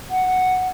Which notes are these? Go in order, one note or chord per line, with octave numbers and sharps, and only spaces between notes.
F#5